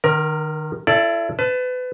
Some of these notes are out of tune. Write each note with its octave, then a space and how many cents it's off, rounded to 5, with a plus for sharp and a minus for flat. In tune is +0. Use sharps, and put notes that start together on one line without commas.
D#3 -30 A#4 +20
E4 +35 A4 +0 D5 +0
B4 +30 A5 +0